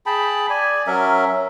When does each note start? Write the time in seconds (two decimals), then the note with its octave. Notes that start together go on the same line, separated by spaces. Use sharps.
0.06 G#4 G5 A5 B5
0.50 D5 G#5
0.87 F#3 C#4 A#4 E5